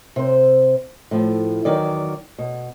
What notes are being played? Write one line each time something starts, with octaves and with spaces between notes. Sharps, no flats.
C3 C5
A2 F3
E2 D#3 F#3 D5
B2